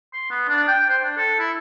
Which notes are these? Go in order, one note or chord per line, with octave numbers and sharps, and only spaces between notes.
C6
B3
D4
G5
C5
D4
A4
E4